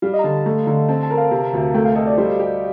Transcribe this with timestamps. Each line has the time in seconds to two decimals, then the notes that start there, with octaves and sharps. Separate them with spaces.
0.02 G3 F5
0.14 D#5
0.19 A#5
0.24 D3 A5
0.36 A5
0.46 A3 A#5
0.67 D3
0.88 C4 A5
1.03 A5
1.10 A#4
1.17 F5
1.31 C3
1.53 D2
1.74 A3 G5
1.85 F5
1.95 A4 D#5
2.07 D5
2.17 G3 C5
2.39 G4